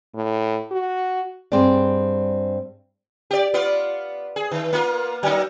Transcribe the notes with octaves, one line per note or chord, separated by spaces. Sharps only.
A2
F#4
G2 G3 C4 G#4 D5
G4 D5
B3 F4 D5
G#4
D#3
A#3 B3 F4
F#3 A#3 D#4